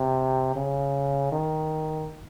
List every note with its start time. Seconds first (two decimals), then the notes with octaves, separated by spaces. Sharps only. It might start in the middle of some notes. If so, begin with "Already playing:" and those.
Already playing: C3
0.56 C#3
1.32 D#3